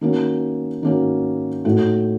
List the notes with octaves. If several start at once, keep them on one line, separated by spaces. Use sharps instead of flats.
D#3 A#3 C#4 F#4
D#3 A#3 C#4 F#4
A2 A3 D#4 F#4